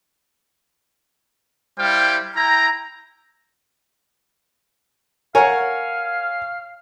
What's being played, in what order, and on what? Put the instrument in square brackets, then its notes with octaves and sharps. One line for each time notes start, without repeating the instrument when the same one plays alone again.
[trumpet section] G3 E4 C5 F5 G5
E4 G5 A#5
[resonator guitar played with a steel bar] A#4 F#5 [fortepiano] C#5 G#5 [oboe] F5